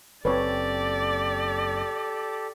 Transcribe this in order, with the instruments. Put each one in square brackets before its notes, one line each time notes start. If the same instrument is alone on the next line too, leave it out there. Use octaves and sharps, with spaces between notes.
[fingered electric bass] F#1 C4 [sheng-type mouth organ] G4 A4 [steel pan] B4 C#5 [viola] D5